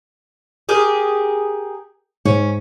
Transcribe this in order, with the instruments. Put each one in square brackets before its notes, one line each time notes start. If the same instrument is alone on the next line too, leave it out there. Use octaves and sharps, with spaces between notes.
[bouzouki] G4 G#4 A#4
[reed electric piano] G#2 [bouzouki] C#4